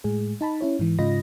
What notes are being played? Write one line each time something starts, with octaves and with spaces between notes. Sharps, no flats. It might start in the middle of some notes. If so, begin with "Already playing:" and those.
A2 G#3 G#4
D#4 A5 B5
C#4 E4 C#5
G#2 E3
G#2 C#3 F4 D#5 B5 A#6